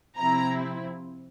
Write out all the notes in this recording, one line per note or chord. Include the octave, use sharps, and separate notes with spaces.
C3 F3 C4 E4 A#5